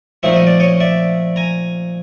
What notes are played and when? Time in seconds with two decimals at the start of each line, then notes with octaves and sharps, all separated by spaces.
0.23 A#2 F3 A3 C4 D#4 E5
0.36 D#5
0.47 D5
0.60 C#5 D#5
0.80 D5 E5
1.36 G#5 A#5